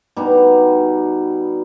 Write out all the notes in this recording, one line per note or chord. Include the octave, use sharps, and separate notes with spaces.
B2 G3 D#4